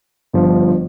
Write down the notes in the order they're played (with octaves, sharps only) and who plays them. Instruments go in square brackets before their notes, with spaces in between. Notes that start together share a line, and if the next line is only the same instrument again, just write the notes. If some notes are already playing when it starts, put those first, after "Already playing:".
[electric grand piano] G1 G2 F3